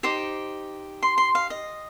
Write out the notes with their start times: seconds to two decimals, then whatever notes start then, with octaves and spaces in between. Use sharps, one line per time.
0.03 D#4 G4 C5 D6
1.03 C6
1.18 C6
1.35 F5
1.50 D#5